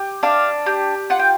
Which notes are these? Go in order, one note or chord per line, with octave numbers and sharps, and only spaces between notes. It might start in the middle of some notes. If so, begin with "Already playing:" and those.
Already playing: G4
D4 F5
G4
F4 F#5
G5